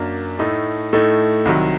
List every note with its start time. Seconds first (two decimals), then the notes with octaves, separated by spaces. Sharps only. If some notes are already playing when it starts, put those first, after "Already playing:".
Already playing: F#2 F#3 A#3 D4
0.39 A2 A3 D#4
0.93 A2 A3 D#4
1.45 C2 C3 D#3 F#3